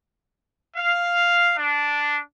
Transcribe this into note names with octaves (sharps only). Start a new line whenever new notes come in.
F5
D4